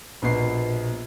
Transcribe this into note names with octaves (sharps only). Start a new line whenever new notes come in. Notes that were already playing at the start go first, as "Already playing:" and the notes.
A#1 B2 C7